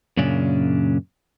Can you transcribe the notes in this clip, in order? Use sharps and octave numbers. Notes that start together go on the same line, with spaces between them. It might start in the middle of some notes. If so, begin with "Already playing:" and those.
F#2 A#2 C#3 C#4 D4